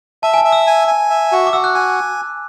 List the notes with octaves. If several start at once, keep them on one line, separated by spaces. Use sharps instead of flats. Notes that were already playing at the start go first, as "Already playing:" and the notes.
E5 A5
G#5
A5
E5
E6
G#5
G#5
E5
F#4
D6
F#4 E6
F#6
G#5 F#6